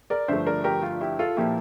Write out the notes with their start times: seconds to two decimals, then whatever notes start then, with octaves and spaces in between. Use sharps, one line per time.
0.10 A#4 D5
0.28 G2 D3 F3 A3 C5 E5
0.47 A#4 D5
0.64 G4 A#4
0.83 F4
1.01 E4 G4
1.19 F4 A4
1.36 A#2 F3 A#3 E4 G4